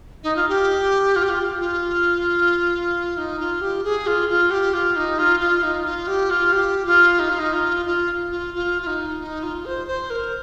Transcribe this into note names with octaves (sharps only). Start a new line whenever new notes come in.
D#4
F4
G4
F4
G4
F4
F4
D#4
F4
G4
G#4
F4
F4
G4
F4
D#4
F4
F4
D#4
D#4
F4
G4
F4
G4
F4
D#4
F4
D#4
F4
F4
F4
F4
F4
D#4
D#4
F4
C5
C5
A#4